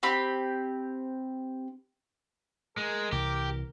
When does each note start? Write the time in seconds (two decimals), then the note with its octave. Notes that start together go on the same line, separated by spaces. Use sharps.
0.03 C4 G4 B5
2.77 G#3 A#4
3.12 C2 E3 G4